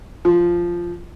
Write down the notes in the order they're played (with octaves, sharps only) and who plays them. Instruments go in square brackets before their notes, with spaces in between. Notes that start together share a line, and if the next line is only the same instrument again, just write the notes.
[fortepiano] F3